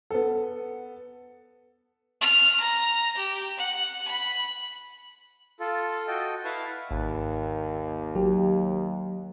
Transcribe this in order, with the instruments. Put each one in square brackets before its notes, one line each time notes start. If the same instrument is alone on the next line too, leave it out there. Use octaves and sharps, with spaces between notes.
[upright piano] B3 A4
[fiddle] F6
A#5
G4
F#5
B5
[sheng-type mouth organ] F4 A4
F#4 A4 D#5 G5
E4 B4 F5 F#5 A5 C#6
[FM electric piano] G#1 [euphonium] D#2
[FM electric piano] F#3 G4